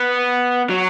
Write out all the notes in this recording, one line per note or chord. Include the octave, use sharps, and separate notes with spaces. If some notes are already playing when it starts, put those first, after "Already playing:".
Already playing: B3
F#3